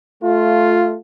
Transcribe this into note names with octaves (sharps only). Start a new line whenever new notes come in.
A3 F4